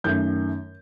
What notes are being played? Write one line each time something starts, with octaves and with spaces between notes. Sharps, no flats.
F#2 D#3 A3 G6